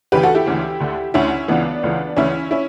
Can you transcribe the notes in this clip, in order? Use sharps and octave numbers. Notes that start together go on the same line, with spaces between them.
D2 C#3 E3 G4 B4
F#4 A4
E4 G4
D2 C#3 E3
D2 D3
D2 D3 C#4 E4
C#2 C#3 E3 B3 D4
C#2 C#3 E3
D2 C#3 E3 C#4 E4
C#4 E4